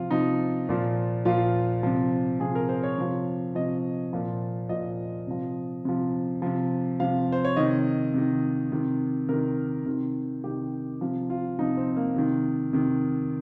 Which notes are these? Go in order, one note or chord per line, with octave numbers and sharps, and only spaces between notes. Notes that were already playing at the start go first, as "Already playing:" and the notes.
Already playing: C3 F3 F4
C3 F3 D#4
A#2 F3
A#2 F3 F4
C3 F3
C3 F3 G#4
A#4
C5
C#5
C3 F3
C3 F3 D#5
A#2 F3
A#2 F3 D#5
C3 F3
C3 F3
C3 F3
C3 F3 F5
C5
C#5
C3 D#3 D#5
C3 D#3
C3 D#3
C3 D#3 A#4
C3 D#3
C3 D#3 G4
C3 F3
F4
C3 F3 D#4
C4
A#3
C3 D#3
C3 D#3